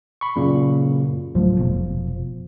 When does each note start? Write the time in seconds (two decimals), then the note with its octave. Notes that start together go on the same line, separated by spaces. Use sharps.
0.21 B5 C#6
0.36 F#2 A#2 C#3
1.35 D1 F3 F#3 A3
1.59 F1 B2